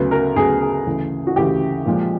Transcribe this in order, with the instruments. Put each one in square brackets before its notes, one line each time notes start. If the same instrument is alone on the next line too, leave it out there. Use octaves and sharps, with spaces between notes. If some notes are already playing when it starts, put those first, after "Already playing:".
Already playing: [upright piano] D2 C#3 F#3 B3 B4
A#4
D2 C#3 F#3 B3 G#4
G#4
D2 C#3 E3
F#4
D2 C#3 E3 G4
A#2 F3 G#3